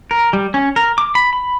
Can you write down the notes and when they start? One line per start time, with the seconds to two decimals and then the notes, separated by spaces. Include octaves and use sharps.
0.11 A#4
0.33 G3
0.54 C#4
0.76 A#4
0.98 D6
1.15 B5
1.33 B5